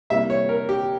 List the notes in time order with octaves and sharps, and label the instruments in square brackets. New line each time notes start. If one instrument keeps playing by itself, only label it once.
[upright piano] C3 G3 A#3 E4 [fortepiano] E5
[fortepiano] C#5
A#4
G4